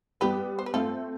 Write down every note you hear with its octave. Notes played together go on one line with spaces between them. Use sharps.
G3 B3 G4 B4
C5
B4
A3 C4 F4 A4